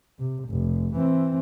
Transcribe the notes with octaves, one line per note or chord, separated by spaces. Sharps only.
C3
F1
E3 C4